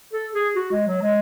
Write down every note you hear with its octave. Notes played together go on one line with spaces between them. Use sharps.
A4
G#4
F#4
G#3
F#3
G#3